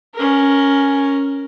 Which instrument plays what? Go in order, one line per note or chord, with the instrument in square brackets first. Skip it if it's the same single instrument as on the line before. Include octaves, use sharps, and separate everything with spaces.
[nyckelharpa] C#4 A#4